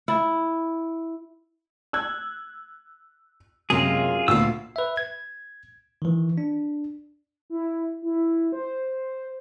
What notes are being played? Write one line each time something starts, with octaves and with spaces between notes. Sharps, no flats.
E4
E6 F#6 G#6
F#2 C3 G#3 A#3 F4 G#4
D2 A#2 B3 E4 F5 E6
B4 E5
G#6
D#3 E3
D4
E4
E4
C5